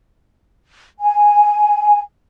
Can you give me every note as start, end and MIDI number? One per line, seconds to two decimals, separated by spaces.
1.00 2.00 80